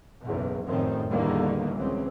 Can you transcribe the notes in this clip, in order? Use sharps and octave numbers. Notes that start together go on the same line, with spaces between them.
F#1 B1 E2 B2
F1 F#2 A2 D#3 F3 C4
E2 A2 D3 D#3 G3 A#3
C#2 E3 F#3 C4